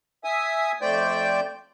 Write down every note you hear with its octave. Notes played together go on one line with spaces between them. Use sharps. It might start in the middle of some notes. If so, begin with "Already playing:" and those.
E5 G#5 D#6
F2 A3 C5 D5 G5 G6